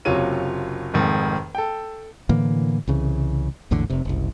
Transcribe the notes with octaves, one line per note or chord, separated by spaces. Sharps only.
F#1 C3 F#3 F4 C#5 D#7
F1 F2 G#2 D#3
A4 G5
A2 D3 E3 A#3
C2 C#3 E3
A#1 E2 A2 D3
F1 C3
F#1 C2